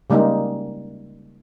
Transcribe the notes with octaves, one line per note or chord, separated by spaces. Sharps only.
C#3 G3 G#3 A#3 D#4